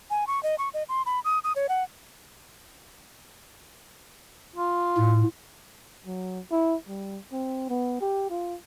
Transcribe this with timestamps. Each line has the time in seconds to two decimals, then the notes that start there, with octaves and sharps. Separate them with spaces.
0.10 G#5
0.27 C#6
0.43 D#5
0.59 C#6
0.74 D#5
0.89 C6
1.06 B5
1.25 D#6
1.44 D#6
1.56 C#5
1.69 F#5
4.56 F4
4.98 A2
6.06 F#3
6.51 E4
6.88 G3
7.32 C4
7.69 B3
8.01 G4
8.30 F4